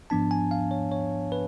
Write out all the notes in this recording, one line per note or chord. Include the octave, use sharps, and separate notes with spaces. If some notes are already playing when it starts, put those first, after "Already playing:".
G#2 F3 B3 D4 A5
G#5
F5
C#5
C#5
B4